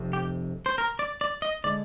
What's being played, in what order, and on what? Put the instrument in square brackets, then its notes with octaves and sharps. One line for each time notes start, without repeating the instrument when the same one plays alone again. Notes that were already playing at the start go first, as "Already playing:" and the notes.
Already playing: [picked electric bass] F1 F2 C3
[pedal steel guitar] G4
C5
A#4
D5
D5
D#5
[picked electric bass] D3 G#3 [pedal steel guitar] D5